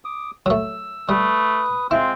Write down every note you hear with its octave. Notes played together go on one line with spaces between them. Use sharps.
D6 D#6
F#3 A3 E6
G3 A3 B4 D#6
G#3 C4 E4 F4